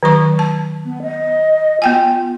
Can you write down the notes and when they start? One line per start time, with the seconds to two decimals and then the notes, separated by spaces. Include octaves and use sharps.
0.03 D#3 F#3 C#6
0.39 A5
0.85 B3
1.03 D#5
1.82 B3 F4 G5 G#5